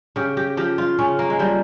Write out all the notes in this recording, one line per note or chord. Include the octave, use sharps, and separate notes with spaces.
C#3 G4
G4
F3 G4
F4
C#3 C#4
A#3
G#3
F3 G3